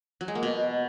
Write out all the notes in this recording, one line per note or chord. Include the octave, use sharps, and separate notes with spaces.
F#3
G#3
A#3
B2